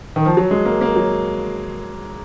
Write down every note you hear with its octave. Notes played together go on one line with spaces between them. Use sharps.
D#3
F3
F#3
G#3
A#3
A#3
F#3